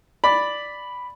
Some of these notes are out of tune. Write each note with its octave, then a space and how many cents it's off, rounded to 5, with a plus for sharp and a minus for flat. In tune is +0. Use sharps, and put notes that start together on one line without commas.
D5 +0 B5 +0